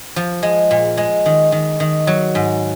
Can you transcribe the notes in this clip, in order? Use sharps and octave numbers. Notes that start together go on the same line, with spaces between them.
F3
G#3
A#2
G#3
D#3
D#3
D#3
F#3
G#2